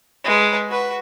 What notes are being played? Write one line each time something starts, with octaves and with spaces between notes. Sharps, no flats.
G#3 B4
F#4 B4